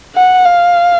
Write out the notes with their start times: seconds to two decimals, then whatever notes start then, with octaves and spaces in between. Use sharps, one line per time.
0.15 F#5
0.45 F5